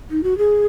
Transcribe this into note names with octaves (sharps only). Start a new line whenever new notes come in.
D#4
F#4
G#4